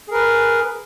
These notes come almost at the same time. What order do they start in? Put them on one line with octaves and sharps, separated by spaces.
G#4 A#4 B4